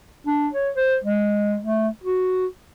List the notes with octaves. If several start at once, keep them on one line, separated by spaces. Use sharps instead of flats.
D4
C#5
C5
G#3
A3
F#4